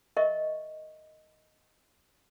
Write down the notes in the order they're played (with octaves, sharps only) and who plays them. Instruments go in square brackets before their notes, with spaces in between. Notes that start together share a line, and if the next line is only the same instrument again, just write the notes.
[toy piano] A#4 D#5 E5 C#6